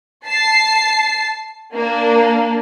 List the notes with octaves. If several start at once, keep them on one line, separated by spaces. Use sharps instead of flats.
A5 C7
A#3 D4